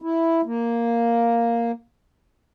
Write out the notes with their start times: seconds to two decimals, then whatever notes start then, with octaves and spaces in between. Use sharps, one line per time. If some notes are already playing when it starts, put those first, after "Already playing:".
0.02 E4
0.45 A#3